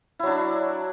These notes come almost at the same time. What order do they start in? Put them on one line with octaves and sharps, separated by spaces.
E4 F#3 D4